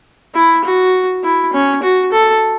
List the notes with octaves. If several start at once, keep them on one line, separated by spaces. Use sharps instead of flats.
E4
F#4
E4
C#4
F#4
A4